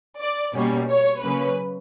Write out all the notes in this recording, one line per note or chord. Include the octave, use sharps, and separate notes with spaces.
D5
B2 G3 A#3 C#4
C#5
C#3 F#3 A#3 C#4 B4